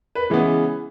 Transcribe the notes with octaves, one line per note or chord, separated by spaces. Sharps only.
B4
C#3 E3 G#3 B3